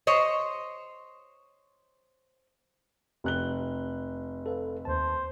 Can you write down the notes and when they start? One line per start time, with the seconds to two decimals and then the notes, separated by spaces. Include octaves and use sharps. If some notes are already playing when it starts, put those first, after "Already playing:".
0.07 C5 C#5 D#5
3.24 F1 F#6 G7
4.46 A4 B4 F5
4.85 D#2 C5 A5